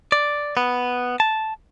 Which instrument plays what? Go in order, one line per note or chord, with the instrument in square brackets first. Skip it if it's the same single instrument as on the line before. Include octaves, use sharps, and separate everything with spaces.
[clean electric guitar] D5
B3
A5